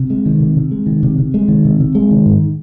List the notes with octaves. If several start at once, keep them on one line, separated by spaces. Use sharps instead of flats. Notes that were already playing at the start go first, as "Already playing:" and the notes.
Already playing: C3
G#3
D#3
C3
C3
G#3
D#3
C3
C3
G#3
D#3
C3
C3
G#3
D#3
G#2